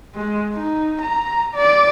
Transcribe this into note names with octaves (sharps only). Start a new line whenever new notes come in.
G#3
D#4
A#5
D5